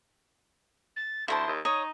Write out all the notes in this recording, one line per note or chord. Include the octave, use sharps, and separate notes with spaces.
A6
D2 E4 C5 A5 C6
D#2
D#4 C#5 D#6